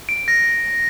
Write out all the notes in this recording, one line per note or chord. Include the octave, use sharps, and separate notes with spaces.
D7
A#6